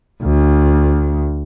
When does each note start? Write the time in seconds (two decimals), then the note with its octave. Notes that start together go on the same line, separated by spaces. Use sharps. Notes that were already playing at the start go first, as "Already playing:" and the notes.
0.23 D2